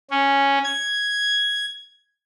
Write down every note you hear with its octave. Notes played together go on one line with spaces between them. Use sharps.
C#4
G#6